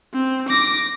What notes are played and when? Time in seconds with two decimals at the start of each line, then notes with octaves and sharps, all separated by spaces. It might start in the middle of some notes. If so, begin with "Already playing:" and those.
0.13 C4
0.49 D6 A#6